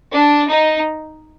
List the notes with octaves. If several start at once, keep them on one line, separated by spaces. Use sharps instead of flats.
D4
D#4